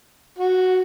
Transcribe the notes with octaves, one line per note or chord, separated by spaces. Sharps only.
F#4